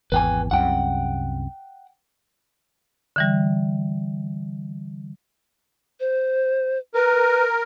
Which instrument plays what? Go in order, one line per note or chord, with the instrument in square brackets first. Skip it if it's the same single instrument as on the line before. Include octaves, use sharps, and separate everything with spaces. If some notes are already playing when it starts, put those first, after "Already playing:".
[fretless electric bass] G#1 E2 [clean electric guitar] B4 G5 G#5
[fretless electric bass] C2 F#2 C3 [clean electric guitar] F#5 G5
[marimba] D3 E3 G3
[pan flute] C5
[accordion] A#4 [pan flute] B4